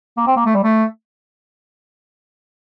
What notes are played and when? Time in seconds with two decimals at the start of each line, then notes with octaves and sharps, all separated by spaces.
0.17 A#3
0.27 C4
0.37 A#3
0.46 A3
0.55 G3
0.64 A3